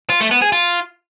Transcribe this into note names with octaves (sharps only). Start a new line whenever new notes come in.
F4
A3
B3
G#4
F4